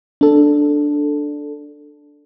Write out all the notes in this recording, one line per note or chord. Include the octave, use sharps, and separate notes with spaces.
D4 A4